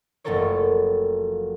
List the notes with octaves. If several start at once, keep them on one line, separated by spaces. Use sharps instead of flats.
F#1 F3 A3 A4 A#4 C#5